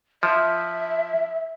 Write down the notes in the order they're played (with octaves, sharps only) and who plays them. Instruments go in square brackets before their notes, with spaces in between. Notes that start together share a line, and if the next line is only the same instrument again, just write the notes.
[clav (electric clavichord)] F3 [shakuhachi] E5